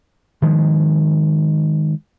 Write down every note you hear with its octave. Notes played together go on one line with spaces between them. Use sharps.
D#3 F3 G#3